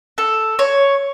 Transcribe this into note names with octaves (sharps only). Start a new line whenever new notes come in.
A4
C#5